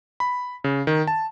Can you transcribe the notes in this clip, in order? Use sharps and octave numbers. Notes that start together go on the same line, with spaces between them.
B5
C#3
D#3
A5